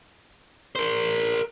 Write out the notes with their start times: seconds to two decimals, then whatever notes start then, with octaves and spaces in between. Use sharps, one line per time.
0.76 A#4 C5